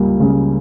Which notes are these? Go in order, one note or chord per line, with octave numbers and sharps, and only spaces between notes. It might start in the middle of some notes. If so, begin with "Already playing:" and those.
Already playing: C#2 G3 A#3
C#3